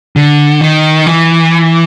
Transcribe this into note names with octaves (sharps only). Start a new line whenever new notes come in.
D3
D#3
E3